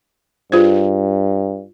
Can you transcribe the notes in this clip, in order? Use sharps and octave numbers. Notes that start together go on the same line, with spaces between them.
G2 F4 G#4 C5